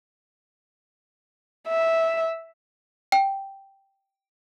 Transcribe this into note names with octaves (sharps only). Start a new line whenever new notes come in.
E5
G5